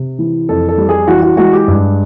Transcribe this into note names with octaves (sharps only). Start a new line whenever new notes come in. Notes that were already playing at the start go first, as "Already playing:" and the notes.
Already playing: C3
E3
F2 A4
A4
G3
G#4
E3 F#4
F#4
G#3 F#4
G4
G2